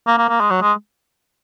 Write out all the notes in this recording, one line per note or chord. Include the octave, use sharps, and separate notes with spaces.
A#3
A#3
A#3
G#3
F#3
G#3